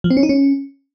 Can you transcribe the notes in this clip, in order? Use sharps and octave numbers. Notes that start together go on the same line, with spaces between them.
F3
C4
C#4
D#4
C#4